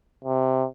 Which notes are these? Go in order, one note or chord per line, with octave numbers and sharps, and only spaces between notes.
C3